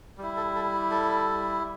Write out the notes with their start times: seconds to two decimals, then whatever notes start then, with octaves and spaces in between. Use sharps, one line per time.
0.18 G3 E4
0.37 A4
0.55 A4
0.91 A4